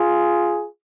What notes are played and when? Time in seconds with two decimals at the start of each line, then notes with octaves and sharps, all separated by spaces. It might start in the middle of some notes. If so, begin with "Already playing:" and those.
Already playing: F4 G#4